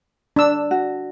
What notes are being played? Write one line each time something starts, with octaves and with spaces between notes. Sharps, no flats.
D4 E6
F#4